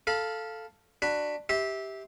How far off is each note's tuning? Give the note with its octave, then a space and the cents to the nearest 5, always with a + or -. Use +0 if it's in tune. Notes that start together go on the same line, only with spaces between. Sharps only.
A4 +0 F5 +0 B5 -30
D4 +15 F#4 +0 B5 +0
G4 +0 E5 -20 C6 +0